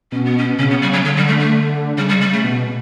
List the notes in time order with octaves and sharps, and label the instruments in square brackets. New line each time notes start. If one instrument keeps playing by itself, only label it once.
[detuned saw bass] B2 [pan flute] C#4
[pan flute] B3
C#4
[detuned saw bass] C#3 [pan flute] C#4
[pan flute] B3
G3
F#3
[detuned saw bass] D3 [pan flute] F#3
[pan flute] G3
A3
A3
[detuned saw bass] D3
[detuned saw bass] C#3 [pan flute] G3
[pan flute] G3
G3
A3
[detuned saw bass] B2